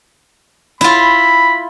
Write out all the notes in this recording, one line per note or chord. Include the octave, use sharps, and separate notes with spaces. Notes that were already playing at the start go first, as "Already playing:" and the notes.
E4 F4 B5